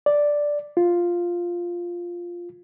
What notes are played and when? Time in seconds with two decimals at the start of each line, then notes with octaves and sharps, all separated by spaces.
0.06 D5
0.77 F4